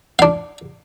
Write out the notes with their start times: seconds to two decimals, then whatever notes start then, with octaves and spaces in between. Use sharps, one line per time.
0.19 D4 F5